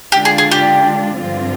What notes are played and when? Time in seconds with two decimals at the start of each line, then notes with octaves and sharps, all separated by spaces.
0.12 D3 G#3 D4 F4 G4
0.25 G#4
0.38 G#4
0.51 G4
1.16 G2 D3 F3 C4 F4